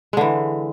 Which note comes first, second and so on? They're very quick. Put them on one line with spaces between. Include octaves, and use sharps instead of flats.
G#3 D3 E3